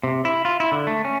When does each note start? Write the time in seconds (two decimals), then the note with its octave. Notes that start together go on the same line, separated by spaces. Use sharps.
0.03 C3
0.25 E4
0.45 F4
0.60 E4
0.72 D3
0.87 A3
1.05 C#4